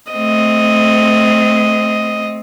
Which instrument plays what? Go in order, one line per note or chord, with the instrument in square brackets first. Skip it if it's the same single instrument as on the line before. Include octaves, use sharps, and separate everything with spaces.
[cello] A3 C4 [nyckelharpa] D#5